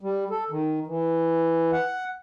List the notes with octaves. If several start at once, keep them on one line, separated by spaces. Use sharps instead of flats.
G3
A4
D#3
E3
F#5